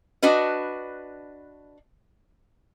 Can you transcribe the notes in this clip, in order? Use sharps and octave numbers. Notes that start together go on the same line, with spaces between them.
D4 F#4 B4 D#5